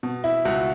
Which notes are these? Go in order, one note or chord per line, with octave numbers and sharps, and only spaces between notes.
B2
E4
C#2 F#4